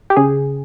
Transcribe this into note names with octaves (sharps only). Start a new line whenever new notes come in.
G4
C#3 G#4